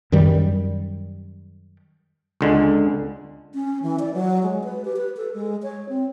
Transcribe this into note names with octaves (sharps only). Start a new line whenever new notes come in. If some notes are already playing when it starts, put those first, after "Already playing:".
F#2 D#3 G3
C#2 D3 G#3
C#4
E3
D5
F#3
G#3
B4
G4
B4
A4
G#3
C#5
C4